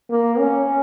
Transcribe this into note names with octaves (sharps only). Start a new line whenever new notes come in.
A#3
C#4